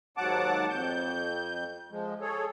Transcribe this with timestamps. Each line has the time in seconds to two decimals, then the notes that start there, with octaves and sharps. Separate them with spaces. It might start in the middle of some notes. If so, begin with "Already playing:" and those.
0.17 D#2 G#2 F#3 F#5 A5 D6
0.70 F2 G6
1.91 F3 G#3
2.21 G#4 A4 C#5